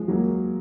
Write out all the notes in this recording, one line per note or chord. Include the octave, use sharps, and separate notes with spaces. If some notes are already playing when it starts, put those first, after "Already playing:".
Already playing: F3 G#3
F#3 A#3